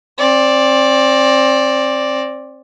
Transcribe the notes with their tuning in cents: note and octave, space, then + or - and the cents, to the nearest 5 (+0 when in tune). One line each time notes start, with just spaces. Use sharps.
C4 +25 D5 +0